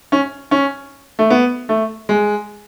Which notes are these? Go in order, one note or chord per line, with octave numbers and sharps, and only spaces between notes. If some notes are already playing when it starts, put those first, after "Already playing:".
C#4
C#4
A3
B3
A3
G#3